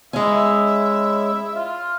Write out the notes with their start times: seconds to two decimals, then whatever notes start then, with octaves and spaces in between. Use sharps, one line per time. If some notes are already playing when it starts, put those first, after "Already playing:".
0.13 G#3 C#4 E4 E5
1.56 F4